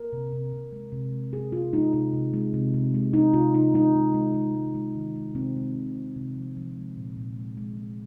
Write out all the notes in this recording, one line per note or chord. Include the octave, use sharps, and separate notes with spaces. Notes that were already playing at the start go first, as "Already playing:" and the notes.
Already playing: A#4
C3
C3
C3
G#3
C3
G#3
G#3 G#4
G#3 F4
G#3 D#4
C3 D#4
C3
G#3
C3
C3
G#3
G#3 D#4
C3 F4
C3 D#4
G#3 D#4
G#3
G#3
G#3
G#3
G#3
D#3
G#3
C3 C4
G#3
C3
G#3
C3
F3
F3
G#3
A#2
A#2
G#3
G#3
G#3